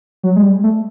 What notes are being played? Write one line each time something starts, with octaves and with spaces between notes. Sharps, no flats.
F#3
G#3
G3
A3